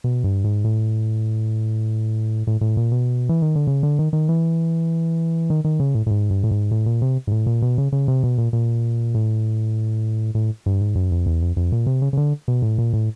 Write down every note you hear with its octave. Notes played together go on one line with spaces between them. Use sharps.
B2
G2
G#2
A2
A2
A2
A#2
B2
E3
D#3
D3
C#3
D3
D#3
D#3
E3
D#3
D#3
C#3
A2
A2
G#2
G2
A2
G#2
A2
A#2
C3
G#2
A2
A#2
B2
C#3
C#3
C3
B2
A#2
A#2
A2
A2
G2
G#2
F#2
F2
E2
F2
F2
A#2
C3
C#3
C#3
D3
B2
A2
A#2
A2